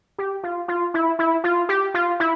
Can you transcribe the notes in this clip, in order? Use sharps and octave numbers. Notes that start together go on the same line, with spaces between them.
G4
F4
F4
E4
E4
F4
G4
F4
E4